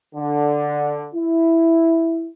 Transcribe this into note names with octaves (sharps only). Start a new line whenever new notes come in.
D3
E4